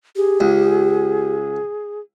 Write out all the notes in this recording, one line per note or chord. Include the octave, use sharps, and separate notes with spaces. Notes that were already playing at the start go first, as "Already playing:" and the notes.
G4 G#4
C#2